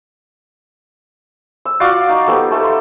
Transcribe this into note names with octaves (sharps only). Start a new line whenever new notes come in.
E6
F4 F#4 D5 F5
D#4
B3 G4 A4 C5
A3 A4
C6